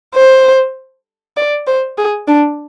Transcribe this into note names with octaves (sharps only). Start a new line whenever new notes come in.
C5
D5
C5
G#4
D4